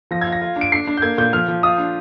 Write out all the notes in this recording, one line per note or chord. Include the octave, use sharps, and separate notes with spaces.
F3 A#6
G#6
F4
A#6
F4
D4
D7
D4 C7
D4
G6
A#3 G#6
A#2 G6
F3 F6
F3
F4 D#6
D4